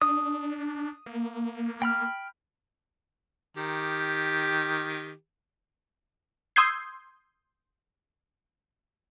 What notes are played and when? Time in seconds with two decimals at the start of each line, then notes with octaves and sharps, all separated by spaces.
0.01 D4 D#6
1.06 A#3
1.82 G5 B5 F6
3.57 D#3 G4
6.56 C6 D#6 E6 G6 G#6 C7